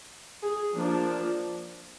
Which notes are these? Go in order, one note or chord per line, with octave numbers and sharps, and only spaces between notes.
G#4
F3 A#3 D4